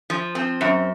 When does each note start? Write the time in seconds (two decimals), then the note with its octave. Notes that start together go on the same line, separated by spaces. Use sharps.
0.10 F3
0.35 C4
0.61 F#2